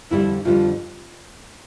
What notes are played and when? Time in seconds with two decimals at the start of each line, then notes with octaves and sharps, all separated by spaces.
0.11 F2 D3 G3 E4
0.45 F2 D3 G3 F4